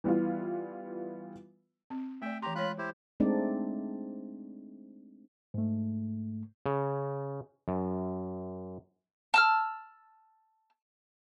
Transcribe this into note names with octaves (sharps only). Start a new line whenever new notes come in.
E3 G3 B3 E4 F4
C4
A3 D5 E5 G5
E3 G4 G5 A#5 C6
G#3 F4 C#5 B5 F#6
E4 G4 C5
G#3 A3 C4 D4 D#4 D5
G#2 A3
C#3
F#2
A5 E6 F6